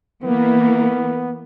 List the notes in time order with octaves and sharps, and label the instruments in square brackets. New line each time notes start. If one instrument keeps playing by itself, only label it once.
[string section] E3 A#3 [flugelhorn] B3